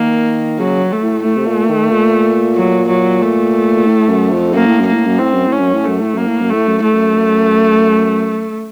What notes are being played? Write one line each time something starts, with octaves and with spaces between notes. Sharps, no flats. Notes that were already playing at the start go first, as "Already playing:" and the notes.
Already playing: D#3 A#3
C#3 F#3
A3
A2
A2 A3
C3
A#2
D#3
A#2
F#3
F#3
A3
A#2
A2
F#2
F2
F#2 A#3
A2
F#2
A#3
A2
F#2
A2 C4
F#2
A2
C#4
F#2
A2
F#2 A3
A2
F#2 A#3
A2
F#2
A2 A3
F#2
A2 A3
F#2
F#2